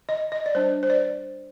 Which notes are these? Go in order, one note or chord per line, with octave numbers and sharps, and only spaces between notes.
D#5
D#5
D5
G3 D4 C5
C5
D5